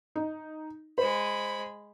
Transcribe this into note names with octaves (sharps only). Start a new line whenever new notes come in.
D#4
G#3 C5 B5